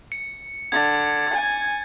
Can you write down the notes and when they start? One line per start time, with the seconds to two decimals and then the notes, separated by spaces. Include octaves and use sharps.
0.12 C#7
0.72 D3 G#6 A6
1.33 G#5